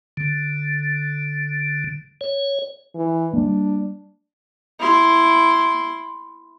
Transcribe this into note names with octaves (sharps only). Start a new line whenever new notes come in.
D3
C#5
E3
G3 A#3 D4
E4 C6